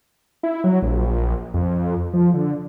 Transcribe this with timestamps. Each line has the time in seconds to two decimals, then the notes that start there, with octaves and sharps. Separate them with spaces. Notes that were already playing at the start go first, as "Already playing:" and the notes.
0.43 E4
0.64 F#3
0.82 A#1
1.54 F2
2.14 F3
2.34 D3